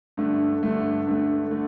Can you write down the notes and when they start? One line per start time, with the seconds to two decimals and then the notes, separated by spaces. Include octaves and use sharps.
0.17 G2 D3 A3
0.63 G2 D3 A3
1.07 G2 D3 A3
1.51 D3 A3